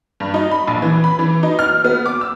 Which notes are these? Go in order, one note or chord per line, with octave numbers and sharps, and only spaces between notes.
G2
D#4
B5
A#1
E3
B5
E3
D#4
F6
B3
D6
E6